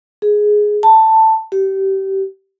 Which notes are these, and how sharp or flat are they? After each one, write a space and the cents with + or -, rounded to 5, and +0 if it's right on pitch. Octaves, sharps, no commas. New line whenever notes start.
G#4 +5
A5 +10
G4 -25